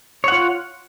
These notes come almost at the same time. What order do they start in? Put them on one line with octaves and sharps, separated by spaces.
C#5 F#5 F4